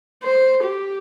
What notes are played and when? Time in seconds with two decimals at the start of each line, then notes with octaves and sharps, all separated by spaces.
0.24 C5
0.63 G4